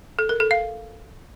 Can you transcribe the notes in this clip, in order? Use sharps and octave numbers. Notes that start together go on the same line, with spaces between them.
A4
A#4
A4
F5